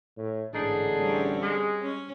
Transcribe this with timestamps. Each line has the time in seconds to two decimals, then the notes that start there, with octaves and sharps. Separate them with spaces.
0.17 A2
0.54 A1 G#2 D3 D4 D#4 G#4
0.95 G3 C4 C#4
1.41 G#3
1.82 C#4